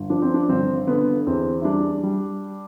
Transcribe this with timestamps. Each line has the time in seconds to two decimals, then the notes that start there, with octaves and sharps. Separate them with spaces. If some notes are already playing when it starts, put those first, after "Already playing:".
Already playing: G1
0.09 F3 D4
0.22 C4
0.34 D4
0.49 G1 C4
0.87 D3 B3
1.26 E2 C4
1.61 E4
1.64 G3 D4
2.03 G3